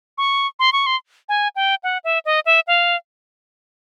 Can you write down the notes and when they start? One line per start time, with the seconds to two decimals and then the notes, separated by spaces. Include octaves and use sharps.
0.18 C#6
0.59 C6
0.73 C#6
0.86 C6
1.29 G#5
1.56 G5
1.83 F#5
2.04 E5
2.25 D#5
2.46 E5
2.67 F5